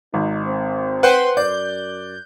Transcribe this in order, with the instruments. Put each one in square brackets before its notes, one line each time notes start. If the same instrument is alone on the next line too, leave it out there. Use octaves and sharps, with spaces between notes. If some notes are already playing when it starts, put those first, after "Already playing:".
[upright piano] G#1 [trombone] D#4
[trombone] C4
[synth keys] B4 C5 C6 [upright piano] F#5 G5 F#6
[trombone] F#2 [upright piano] D5 [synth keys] G6